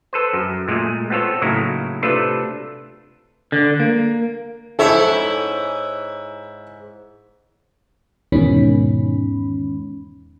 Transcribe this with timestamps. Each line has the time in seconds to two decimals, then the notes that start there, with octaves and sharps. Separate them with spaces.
0.13 A4 B4 C5
0.33 F#2
0.68 A#2 G#3 A3
1.10 B3 C4 F4 A4 C#5
1.42 A2 C#3 F#3 A#3 D#4 E4
2.03 C3 A3 D4 F4 A4 B4
3.52 D3
3.80 A#3
4.79 G#2 E4 A4 C#5 E5
8.32 E2 G#2 B2 D#3 C#4 B5